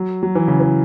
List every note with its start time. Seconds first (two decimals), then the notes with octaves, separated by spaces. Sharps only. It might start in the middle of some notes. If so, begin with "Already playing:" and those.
Already playing: F#3
0.23 F#3
0.35 E3
0.48 C#3
0.60 E3